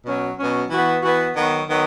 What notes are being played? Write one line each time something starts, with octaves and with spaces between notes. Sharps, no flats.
B2 F#3 C#4
B2 F#3 C#4
E3 B3 F#4
E3 B3 F#4
D#3 F#3 B3
D#3 F#3 B3